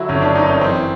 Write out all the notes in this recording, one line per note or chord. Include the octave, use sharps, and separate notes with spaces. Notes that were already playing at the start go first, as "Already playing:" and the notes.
Already playing: D3 F#3 E4 F#4
G1 C#4
D4
F#2 D#4
C#4
E3 C4